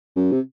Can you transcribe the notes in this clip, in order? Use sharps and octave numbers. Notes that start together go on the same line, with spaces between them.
F#2
C3